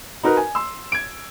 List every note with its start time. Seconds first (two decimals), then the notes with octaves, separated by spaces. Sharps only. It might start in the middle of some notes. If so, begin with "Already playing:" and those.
0.23 D#4 F#4 A#4 B4
0.37 G#5
0.55 C6 E6
0.92 G#6 D7